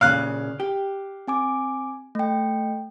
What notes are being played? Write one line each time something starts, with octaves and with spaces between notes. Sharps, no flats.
A#2 C#3 F5 F#6
G4
C4 G#5 D6
A3 G5